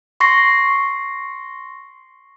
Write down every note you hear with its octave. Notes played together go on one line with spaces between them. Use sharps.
C6 C#6 A#6 C7